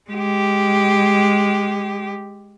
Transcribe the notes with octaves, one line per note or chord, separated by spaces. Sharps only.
G#3 G4